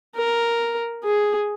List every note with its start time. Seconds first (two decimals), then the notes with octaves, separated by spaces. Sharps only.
0.16 A#4
1.05 G#4